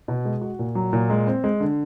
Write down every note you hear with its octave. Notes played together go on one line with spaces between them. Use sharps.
B2
G#3
F#4
A#2
F#3
A#2
G#3
C4
G#3
D3